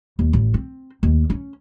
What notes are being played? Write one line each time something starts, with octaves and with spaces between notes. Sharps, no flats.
D#2
A1
C4
D#2
C#4